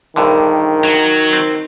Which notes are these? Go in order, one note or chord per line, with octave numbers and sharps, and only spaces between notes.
A#1 G2 D3 D#3
F#3
C4